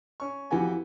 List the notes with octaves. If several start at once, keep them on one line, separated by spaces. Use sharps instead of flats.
C#4 C#6
F2 E3 B3 F#4 G4 G#5